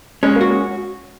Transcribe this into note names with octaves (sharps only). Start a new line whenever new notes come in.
G#3 C#4
A#3
F#4
G#3